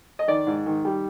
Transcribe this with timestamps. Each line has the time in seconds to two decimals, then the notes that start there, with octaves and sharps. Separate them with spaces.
0.19 D#5
0.28 D#3 D5
0.47 G#2
0.66 D#3
0.85 G3